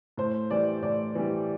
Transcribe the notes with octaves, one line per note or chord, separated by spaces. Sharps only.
A2 C5
E3 G3 D5
A2 D5
E3 G3